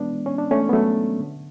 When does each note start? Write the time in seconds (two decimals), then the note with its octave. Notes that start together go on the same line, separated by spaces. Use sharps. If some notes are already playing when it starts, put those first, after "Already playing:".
Already playing: E3 G#3 B3 D4
0.26 C#4
0.38 D4
0.51 A3 C#4
0.69 B3
0.73 F#3 A3
1.20 D3